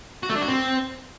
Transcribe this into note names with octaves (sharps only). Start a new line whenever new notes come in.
F#4
A3
D4
F#4
C4